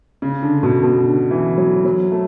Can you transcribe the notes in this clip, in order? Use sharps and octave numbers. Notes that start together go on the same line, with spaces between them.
C#3
D3
B2
B2
D3
E3
F#3
F#3
A3